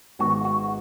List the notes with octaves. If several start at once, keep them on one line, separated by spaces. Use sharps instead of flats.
G#1 G#2 G#3 B3 F#4
F#4